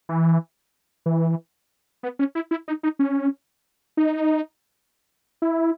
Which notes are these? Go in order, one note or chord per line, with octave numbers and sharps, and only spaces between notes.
E3
E3
B3
C#4
E4
E4
D#4
D#4
C#4
D#4
E4